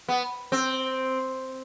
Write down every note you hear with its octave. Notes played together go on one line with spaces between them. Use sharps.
B3
C4